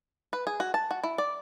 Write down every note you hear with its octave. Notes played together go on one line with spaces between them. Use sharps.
B4
G#4
F#4
A5
F#4
E4
D5